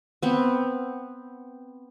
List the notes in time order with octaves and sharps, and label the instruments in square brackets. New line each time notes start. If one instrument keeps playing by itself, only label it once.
[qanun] B3 C4